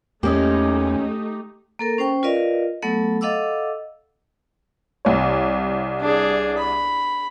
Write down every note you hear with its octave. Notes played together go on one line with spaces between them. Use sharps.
E2 A3 A#3 C#4 D#4 G4 D#5
A#3 A4 A#4
C#4 C5 G5 C#6
F4 A#4 B4 D5 D#5 F5
F#3 A3 B3 A4 F#5
A4 D#5 F5 F#5 D6 E6
C2 C#5
D4 G#4
B5